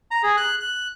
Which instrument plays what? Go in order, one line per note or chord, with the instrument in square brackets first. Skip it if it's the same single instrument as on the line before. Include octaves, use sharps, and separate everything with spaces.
[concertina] A#5
G#4
F#6
F#6